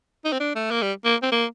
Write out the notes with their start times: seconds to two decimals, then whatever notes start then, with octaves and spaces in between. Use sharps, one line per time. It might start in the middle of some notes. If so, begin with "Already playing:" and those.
0.25 D#4
0.32 C4
0.40 D4
0.55 A3
0.71 A#3
0.82 G3
1.05 A#3
1.23 C4
1.32 A#3